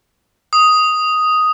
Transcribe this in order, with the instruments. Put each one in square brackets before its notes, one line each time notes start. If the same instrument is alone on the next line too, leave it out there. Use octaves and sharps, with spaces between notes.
[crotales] D#6